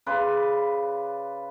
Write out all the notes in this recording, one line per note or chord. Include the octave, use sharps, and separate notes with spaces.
C#3 B4 D5 C6